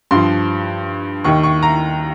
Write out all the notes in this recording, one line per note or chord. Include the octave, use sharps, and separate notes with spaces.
G2 F3 C6
D#2 D#3 C#6
C#6
A#5